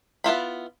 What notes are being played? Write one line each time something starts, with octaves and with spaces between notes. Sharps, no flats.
B3 E4 F4 B5